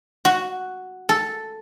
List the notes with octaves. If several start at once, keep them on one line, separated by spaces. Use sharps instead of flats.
F#4
A4